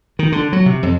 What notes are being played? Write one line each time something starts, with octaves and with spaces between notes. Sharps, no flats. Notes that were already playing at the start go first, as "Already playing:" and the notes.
D#3
D3
F#3
C3
F2